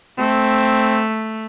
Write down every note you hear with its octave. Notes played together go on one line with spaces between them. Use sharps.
A3 C4